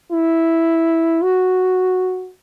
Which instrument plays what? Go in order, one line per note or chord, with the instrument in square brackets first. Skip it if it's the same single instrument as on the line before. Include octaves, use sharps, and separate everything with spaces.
[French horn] E4
F#4